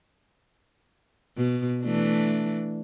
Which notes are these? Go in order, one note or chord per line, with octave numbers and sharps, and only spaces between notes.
B2
E3 A3 D4